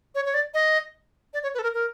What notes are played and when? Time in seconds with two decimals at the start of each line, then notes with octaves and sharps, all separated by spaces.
0.15 C#5
0.25 C#5
0.34 D5
0.54 D#5
1.34 D5
1.43 C#5
1.54 B4
1.59 A4
1.63 A#4
1.74 A#4